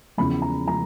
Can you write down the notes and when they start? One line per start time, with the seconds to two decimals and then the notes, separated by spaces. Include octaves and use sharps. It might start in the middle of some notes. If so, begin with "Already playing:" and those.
0.17 E2 C#3 F3 B5
0.42 A#5
0.68 C#3 F3 A#5